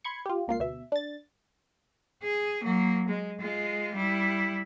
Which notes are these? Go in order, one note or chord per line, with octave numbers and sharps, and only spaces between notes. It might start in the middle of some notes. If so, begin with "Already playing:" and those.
B5 C6 G#6 C#7
F4 G4
C#2 A#3 F4 C7
D2 B2 E5
D4 A6
G#4
F#3 A#3
G#3
G#3 F4
G3 E4